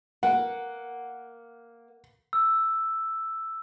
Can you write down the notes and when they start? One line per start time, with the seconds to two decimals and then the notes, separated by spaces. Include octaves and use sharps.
0.23 A#3 F#5
2.33 E6